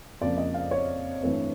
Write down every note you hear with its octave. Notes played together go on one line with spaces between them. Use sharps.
F2 C#3 F3 A#3 D5
D#5
F5
C#5
G2 E3 A3 C4